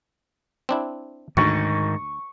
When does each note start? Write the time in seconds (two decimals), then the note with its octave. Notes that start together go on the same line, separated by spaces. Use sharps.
0.69 C4 D4 E4
1.37 D2 G#2 D#3 C#6 D#6